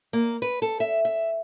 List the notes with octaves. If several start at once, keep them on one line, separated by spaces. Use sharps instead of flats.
A#3
B4
A4
E5
E5